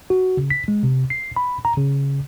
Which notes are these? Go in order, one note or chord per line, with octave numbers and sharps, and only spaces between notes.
F#4
C#3
B6
G#3
C3
C7
B5
A#5
C#3